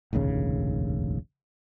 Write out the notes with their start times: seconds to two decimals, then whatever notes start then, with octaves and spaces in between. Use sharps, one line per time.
0.13 F1 A#1 D#2 C#3